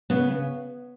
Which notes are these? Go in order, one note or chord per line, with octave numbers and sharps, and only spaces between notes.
C#3 B3